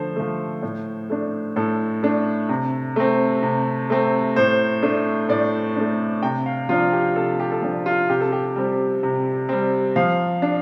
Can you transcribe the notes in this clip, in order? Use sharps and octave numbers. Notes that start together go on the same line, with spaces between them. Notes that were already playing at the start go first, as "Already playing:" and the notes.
Already playing: D3 F3 A3 A4 C5
F3 A3
A2
A3 D4
A2 A4
A3 D4
C3
A3 C4
C3
A3 C4
A2 C5
A3 D4
A2 D5
A3 D4
C3 G5
F5
F3 D4 F4
G4
C3 A4
G4
A4
F3 D4 G4
F4
C3 G4
A4
G4
G3 C4
C3
G3 C4
F3 F5
D4